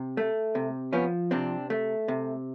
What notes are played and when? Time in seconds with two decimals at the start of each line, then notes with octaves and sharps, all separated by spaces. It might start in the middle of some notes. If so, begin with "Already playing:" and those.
Already playing: C3
0.17 A3
0.55 C3
0.93 F3 B3 C#4
1.31 C3 C4 D4
1.70 A3
2.08 C3